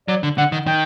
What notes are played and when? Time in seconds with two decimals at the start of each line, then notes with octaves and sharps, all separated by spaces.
0.08 F#3 D5
0.23 D3
0.38 D3 F#5
0.52 D#3
0.67 D#3 G5